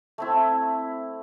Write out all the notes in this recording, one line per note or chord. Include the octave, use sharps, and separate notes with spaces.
A3 C4 E4